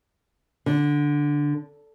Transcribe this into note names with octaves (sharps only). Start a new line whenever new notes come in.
D3